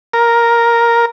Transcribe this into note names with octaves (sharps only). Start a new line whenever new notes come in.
A#4